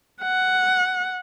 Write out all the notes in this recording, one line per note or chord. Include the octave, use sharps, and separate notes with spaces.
F#5